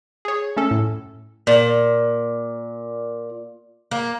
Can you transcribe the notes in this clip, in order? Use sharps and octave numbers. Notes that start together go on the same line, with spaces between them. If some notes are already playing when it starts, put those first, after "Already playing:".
G#4 C#5
A3 C#4 A4
A2
A#2
A#3